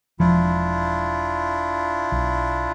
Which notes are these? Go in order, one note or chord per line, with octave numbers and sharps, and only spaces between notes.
E1 F3 D4 E4 F4
B1